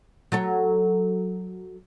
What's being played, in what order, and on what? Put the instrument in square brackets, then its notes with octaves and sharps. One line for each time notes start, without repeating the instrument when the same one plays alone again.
[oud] F#3 A4 C#5